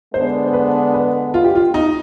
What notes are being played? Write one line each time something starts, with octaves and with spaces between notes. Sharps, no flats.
D3 G#3 B3 D4 C5
B4
B4
F4
G4
F4
D#4